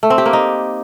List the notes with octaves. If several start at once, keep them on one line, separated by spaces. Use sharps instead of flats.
A3
C4
G4
A#3
D#4